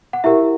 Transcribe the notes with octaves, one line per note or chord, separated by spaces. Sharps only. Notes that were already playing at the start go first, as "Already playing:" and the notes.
F#5
E4 G4 A#4 E5